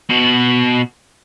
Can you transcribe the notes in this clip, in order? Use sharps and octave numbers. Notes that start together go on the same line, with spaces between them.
B2 F#4